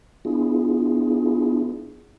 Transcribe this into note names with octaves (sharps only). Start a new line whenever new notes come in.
B3 D4 E4 F4 G#4